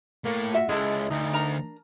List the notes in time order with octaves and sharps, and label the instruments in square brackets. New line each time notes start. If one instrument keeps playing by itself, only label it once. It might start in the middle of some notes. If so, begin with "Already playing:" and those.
[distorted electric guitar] A2 [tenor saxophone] A#3
[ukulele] F4 F#4 E5
[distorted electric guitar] C#2 [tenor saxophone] G#3 [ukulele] E4 A4
[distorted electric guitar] D2 [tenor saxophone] D#4
[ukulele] D4 A#4 A#5